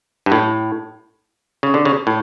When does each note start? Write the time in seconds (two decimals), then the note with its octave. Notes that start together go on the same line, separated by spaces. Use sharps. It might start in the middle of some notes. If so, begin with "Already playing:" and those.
0.26 G2
0.32 A2
1.63 C#3
1.74 D3
1.85 C#3
2.07 A2